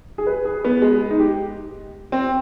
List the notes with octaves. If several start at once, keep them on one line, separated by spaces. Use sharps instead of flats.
G#4
B4
G#4
B3
G#3
D#4
G4
C4